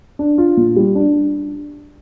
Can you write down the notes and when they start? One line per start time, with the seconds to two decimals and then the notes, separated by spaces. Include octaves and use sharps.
0.19 D4
0.38 F4
0.57 A#2
0.76 G3
0.95 D4